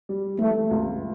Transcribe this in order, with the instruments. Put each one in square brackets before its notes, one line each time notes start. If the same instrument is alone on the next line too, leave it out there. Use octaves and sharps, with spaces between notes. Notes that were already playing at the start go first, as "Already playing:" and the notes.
[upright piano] G3
[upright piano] E3 [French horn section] A3
[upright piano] C#2